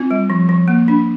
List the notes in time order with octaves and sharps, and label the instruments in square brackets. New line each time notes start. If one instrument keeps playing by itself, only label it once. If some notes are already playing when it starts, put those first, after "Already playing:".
Already playing: [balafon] C4 F4
G3
F3
F3
A#3
D4